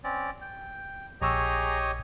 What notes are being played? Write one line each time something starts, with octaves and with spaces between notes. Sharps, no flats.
C4 C#4 D5
G5
A#1 G4 G#4 C#5 D#5 A#5 C#6 E6